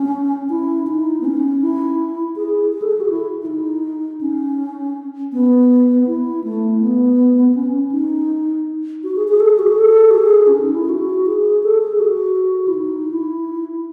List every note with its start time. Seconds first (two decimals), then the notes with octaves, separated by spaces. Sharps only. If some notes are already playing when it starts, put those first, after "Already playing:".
Already playing: C#4
0.49 E4
0.87 D#4
1.21 B3
1.25 C#4
1.62 E4
2.36 G#4
2.72 G#4
2.82 A4
2.91 G#4
3.00 F#4
3.10 E4
3.41 E4
3.46 D#4
4.21 C#4
5.32 B3
6.07 E4
6.44 A3
6.80 B3
7.55 C#4
7.73 C#4
7.91 D#4
9.04 F#4
9.16 G#4
9.28 G#4
9.40 A4
9.49 G#4
9.59 F#4
9.68 G#4
9.78 A4
10.11 F#4
10.14 G#4
10.47 C#4
10.61 D#4
10.74 E4
10.89 F#4
11.26 G#4
11.63 A4
11.82 G#4
12.00 F#4
12.68 E4
12.74 D#4
13.11 E4